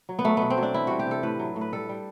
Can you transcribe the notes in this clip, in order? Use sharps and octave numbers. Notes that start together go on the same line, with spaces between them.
F#3
B3
F#3 A3
B2 B3
C4
F#3
D4
E3 E4
G3 F#4
G4
C3 A4
A2 B4
F#3
A2
B4
G3 A4
G3